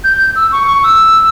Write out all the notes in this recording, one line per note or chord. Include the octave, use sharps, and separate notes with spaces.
G6
E6
C#6
C#6
E6